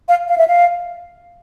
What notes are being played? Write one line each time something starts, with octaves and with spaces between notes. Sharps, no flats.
F5
F5
E5
F5